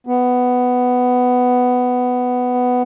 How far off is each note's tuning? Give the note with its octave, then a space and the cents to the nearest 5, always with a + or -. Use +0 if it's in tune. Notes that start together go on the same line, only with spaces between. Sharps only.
B3 +10